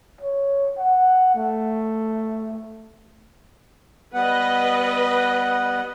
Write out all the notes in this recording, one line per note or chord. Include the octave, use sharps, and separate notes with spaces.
C#5
F#5
A3
G3 B3 B4 D#5 F#5